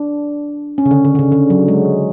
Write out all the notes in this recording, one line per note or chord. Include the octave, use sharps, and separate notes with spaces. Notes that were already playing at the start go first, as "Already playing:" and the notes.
Already playing: D4
C#4
C#3
D3
D3
D3
C#3
D3
F#3
G#3